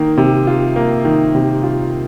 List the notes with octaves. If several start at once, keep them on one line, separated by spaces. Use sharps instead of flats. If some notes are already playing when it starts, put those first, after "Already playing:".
Already playing: D#3 A#3
C3
F4
A#3
D#3
C3
F4